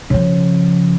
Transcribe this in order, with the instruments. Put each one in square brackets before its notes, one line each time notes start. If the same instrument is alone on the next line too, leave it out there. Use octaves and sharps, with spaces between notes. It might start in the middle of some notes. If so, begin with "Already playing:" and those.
[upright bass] C#3 F3